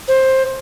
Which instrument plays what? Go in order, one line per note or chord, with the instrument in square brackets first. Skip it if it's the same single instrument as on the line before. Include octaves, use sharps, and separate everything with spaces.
[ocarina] C5